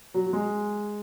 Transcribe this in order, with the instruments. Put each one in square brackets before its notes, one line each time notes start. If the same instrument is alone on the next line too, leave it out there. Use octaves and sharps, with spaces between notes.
[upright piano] F#3
F#3
G#3